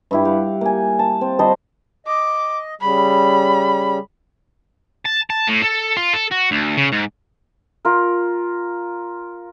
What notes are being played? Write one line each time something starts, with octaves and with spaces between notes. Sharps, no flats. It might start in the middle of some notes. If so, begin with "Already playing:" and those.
G2 E4 G4
G4 F5 F#5
A#3 G#5
A5
C4
G3 C5 D#5 A5
D#5 D6
C#3 G3 B5
A5
A5
A2
A4
F4
A4
F#4
D2
C#3
G#2
F4 A#4